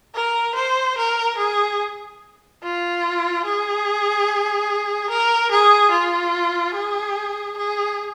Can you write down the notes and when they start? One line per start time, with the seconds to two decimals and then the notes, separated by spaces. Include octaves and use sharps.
0.15 A#4
0.55 C5
0.97 A#4
1.37 G#4
2.62 F4
3.45 G#4
5.10 A#4
5.51 G#4
5.91 F4
6.75 G#4
7.57 G#4